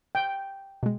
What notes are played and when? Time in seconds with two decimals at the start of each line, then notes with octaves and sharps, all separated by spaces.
0.15 G5
0.83 B2 G#3